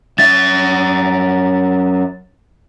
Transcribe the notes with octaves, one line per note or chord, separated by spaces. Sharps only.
F#2 E5 A6